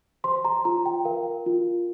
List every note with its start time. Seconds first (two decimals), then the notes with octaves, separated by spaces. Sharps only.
0.24 C5 C6
0.45 A#5
0.65 F4 A#5
0.86 G5
1.05 A#4 F5
1.46 F4